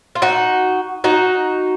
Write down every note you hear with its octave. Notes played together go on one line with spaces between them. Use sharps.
F4
D#4 F#4
D#4 F#4